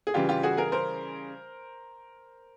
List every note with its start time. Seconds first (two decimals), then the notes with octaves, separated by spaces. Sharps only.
0.07 G#4
0.14 C#3 E3 G3 F4 G4
0.29 F4 G4
0.43 F#4 G#4
0.57 G#4 A#4
0.72 A#4 C5